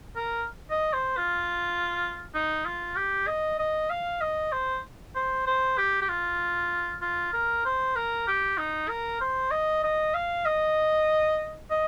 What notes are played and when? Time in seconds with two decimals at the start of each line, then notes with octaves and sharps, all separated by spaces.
0.16 A#4
0.70 D#5
0.93 C5
1.17 F4
2.35 D#4
2.66 F4
2.96 G4
3.27 D#5
3.59 D#5
3.90 F5
4.21 D#5
4.52 C5
5.15 C5
5.47 C5
5.78 G4
6.02 G4
6.09 F4
7.02 F4
7.33 A#4
7.65 C5
7.96 A#4
8.27 G4
8.58 D#4
8.89 A#4
9.21 C5
9.51 D#5
9.84 D#5
10.14 F5
10.46 D#5
11.71 D#5